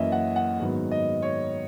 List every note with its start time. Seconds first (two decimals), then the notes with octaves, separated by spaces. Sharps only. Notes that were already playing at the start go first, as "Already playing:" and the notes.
Already playing: F#2 E3 A#3 C#4 D#5 E5
0.12 F#5
0.36 F#5
0.60 G#2 D#3 F#3 B3
0.91 D#5
1.22 C#5